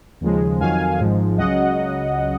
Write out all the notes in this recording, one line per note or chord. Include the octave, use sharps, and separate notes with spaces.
D#2 C#3 F3 G#3
F2 D#3 F#3 F5 G#5
G#1 G#2 F3 G#3
C#2 C#3 F#3 D#5 F#5